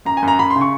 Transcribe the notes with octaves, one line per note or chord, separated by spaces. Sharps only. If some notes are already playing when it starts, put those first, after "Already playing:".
F#2 A#5
G#5
F#2
A#5
F#2 B5
C6
C#3
C#6